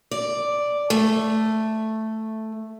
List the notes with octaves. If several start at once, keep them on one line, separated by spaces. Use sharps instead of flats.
D5
A3